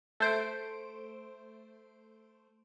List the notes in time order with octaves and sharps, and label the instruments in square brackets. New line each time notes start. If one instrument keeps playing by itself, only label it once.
[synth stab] A3 C5 D7